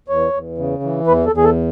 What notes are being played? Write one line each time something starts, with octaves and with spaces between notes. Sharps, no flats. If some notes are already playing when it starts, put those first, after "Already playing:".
E2 C#5
E2
C#3
E3
E2 B4
A4
E2
G#4
A4